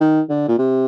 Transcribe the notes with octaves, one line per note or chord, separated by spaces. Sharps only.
D#3
D3
A#2
C3